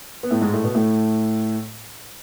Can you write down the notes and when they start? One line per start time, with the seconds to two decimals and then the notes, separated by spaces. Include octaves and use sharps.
0.23 B3
0.30 A2 A3
0.41 G#2 G#3
0.53 A2 A3
0.64 B2 B3
0.75 A2 A3